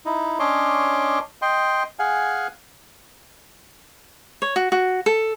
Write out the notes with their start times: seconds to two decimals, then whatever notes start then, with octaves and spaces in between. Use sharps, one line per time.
0.06 D#4 E4
0.39 C#4 D4 C#5 D#5 C6 D6
1.42 D#5 G5 C6
1.99 G#4 F5 F#5 G#5
4.42 C#5
4.56 F#4
4.72 F#4
5.06 A4